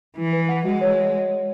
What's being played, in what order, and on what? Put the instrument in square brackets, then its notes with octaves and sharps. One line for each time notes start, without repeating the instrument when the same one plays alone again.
[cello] E3 [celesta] E4
[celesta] B4
F#5
[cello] G#3 [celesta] F#4
[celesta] C#5